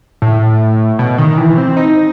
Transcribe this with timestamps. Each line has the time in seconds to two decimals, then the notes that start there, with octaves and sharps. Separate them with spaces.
0.22 A2
0.99 B2
1.18 D#3
1.38 E3
1.57 C4
1.77 D#4